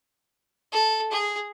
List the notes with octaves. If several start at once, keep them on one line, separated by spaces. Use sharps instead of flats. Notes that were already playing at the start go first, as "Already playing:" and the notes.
A4
G#4